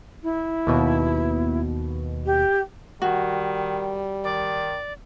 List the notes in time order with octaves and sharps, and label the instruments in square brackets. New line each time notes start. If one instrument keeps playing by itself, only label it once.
[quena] E4
[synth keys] D#2 B2
[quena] G4
[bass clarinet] D#3 [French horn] G3 [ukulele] F#4
[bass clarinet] D#3 [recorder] D5